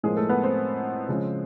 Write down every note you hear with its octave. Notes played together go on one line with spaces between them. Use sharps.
A2 F3 G#3 A#3 G#4
A3 A4
B3 B4
C4 C5
C#3 F3 G#3